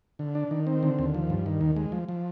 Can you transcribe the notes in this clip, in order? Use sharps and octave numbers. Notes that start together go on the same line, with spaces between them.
D3
D4
D#3
C4
D3
D#2
F3
G2
D#3
D#2
G#3
F3
F3